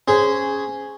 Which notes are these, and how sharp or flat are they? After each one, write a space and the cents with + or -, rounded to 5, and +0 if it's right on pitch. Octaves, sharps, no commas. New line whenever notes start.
C#4 +0 G#4 +0 C5 -20